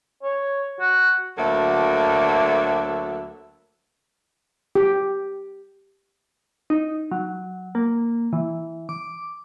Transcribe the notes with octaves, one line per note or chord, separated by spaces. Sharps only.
C#5
F#4
D2 F#3 A#3 A4 E5
G4
D#4
F#3
A#3
E3
D6